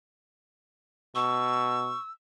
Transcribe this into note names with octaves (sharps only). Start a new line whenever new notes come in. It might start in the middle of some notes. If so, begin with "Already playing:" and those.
B2 C#6 E6